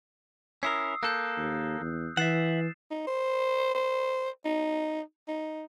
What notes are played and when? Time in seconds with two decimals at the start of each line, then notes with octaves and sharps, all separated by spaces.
0.63 C#4 E4 A#4 D#6 E6 C7
1.03 A#3 A4 F#6 G6
1.37 D#2
1.81 E2
2.17 E3 E5 F#5 A6 C7 E7
2.91 D#4
3.07 C5
3.75 C5
4.45 D#4
5.28 D#4